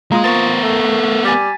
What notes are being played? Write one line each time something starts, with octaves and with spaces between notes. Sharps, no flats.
G#3 A#3 F4 A#4 D#6
B3 C4 A#4 C#6 A6
A3
G3 G#5 A6 B6